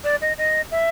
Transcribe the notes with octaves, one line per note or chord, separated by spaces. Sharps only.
D5
D#5
D#5
E5